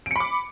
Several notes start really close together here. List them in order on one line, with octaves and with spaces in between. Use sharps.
D7 C#7 B5 D6